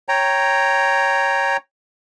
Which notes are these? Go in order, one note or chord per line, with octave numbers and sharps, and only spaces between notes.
C#5 G5 A#5